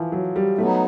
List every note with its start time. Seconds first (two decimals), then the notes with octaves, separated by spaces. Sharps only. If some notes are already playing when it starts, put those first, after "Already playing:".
Already playing: E3 F3
0.12 F#3
0.36 G3
0.58 F#3 A3 B3 D#4